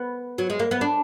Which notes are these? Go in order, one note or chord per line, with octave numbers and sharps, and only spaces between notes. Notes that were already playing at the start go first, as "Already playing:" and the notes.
Already playing: B3
F#3
G#3
A#3
B3
D4